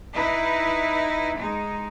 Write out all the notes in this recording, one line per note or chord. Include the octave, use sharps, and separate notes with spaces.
D#4 E4 B4
G#3 D#4